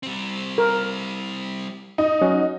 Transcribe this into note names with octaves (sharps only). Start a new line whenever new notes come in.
G3 C4
A#4
D#4
F#3 C#4 F#5